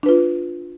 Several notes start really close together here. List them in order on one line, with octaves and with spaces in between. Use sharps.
D4 B4 F4